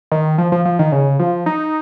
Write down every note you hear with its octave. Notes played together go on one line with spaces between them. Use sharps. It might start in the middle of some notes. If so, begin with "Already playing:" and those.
D#3
F3
F3
F3
D#3
C#3
F3
D#4